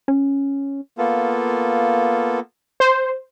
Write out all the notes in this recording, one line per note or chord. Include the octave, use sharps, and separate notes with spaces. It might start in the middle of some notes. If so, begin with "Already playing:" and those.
C#4
A#3 B3 F4 A4
C5